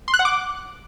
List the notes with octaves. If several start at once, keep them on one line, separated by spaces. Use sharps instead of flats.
C6
F#6
F#5
D6